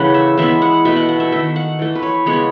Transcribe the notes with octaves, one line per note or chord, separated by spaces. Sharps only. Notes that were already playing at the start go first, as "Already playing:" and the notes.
Already playing: C#3 E3 A3 B4 F#5
E5
E3 G#3 B3 E5
F#5
B2 A3 E5
F#5
F#5
E5
D#3 A3 E5
F#5
E3 A3
B4
C#5
C#3 G#3 B3 C#5